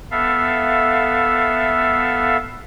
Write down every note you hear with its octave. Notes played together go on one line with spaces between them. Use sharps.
B3 A4 E5 F5